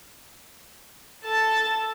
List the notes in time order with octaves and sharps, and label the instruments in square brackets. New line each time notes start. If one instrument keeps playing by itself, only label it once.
[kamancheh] A4 A5